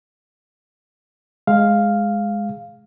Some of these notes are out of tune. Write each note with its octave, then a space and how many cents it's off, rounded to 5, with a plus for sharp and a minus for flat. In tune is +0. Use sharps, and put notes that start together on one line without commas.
G#3 +0 F5 +0